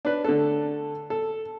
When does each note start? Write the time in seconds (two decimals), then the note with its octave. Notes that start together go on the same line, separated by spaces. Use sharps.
0.05 D4 B4
0.24 D3 A3 A4
1.10 A4